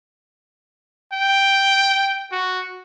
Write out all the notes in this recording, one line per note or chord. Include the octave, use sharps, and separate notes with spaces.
G5
F#4